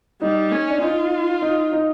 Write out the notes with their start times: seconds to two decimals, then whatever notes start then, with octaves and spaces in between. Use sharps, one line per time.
0.21 G3 D#4
0.52 C#4
0.70 D4
0.81 D#4 F4
1.42 D#4
1.73 D#4